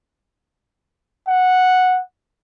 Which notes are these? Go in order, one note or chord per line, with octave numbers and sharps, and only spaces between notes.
F#5